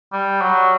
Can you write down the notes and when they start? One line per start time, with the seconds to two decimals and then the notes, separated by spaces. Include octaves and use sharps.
0.12 G3
0.42 F#3